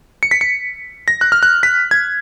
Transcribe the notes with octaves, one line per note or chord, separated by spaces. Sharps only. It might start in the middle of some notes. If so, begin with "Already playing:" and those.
C#7
B6
C#7
A#6
F#6
F6
F#6
B6
G#6